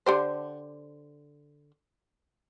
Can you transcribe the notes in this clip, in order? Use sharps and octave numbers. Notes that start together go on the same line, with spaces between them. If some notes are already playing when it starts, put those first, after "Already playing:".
D3 G4 C5